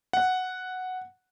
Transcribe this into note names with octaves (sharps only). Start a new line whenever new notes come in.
F#5